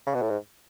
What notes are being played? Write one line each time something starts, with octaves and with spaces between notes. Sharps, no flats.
C#3
B2
A2
G#2